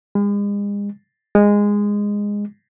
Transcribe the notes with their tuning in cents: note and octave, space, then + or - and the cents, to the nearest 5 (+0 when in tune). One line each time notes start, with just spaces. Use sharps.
G#3 -40
G#3 -15